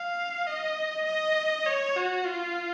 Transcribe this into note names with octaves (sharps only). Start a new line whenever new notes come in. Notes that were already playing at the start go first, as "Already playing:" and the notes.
Already playing: F5
D#5
D#5
C#5
F#4
F4